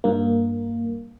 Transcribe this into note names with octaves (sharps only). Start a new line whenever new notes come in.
G2 A#3